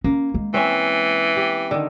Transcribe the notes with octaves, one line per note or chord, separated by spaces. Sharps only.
A#3 C#4
G#3
E3 C4 C#4 E5
G4
D3 D#3